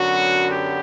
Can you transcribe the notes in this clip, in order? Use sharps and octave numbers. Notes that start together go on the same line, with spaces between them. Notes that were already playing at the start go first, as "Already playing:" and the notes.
Already playing: F#2 D3 F#3 B3 F#4
G4